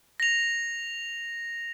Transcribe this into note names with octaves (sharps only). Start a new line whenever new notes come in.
A#6 F7